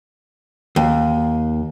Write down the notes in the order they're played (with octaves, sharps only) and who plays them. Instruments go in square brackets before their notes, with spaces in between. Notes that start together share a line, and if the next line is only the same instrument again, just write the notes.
[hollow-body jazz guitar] D#2